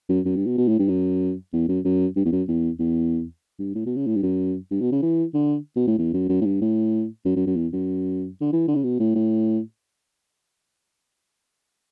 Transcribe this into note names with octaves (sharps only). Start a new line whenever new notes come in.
F#2
F#2
G2
B2
B2
A2
G2
F#2
E2
F#2
F#2
G2
E2
F#2
E2
E2
G2
A2
B2
C#3
A2
G2
F#2
G2
B2
C#3
E3
D3
B2
A2
E2
F#2
F#2
A2
G2
A2
F#2
F#2
F#2
E2
F#2
D3
E3
D3
C#3
B2
A2
A2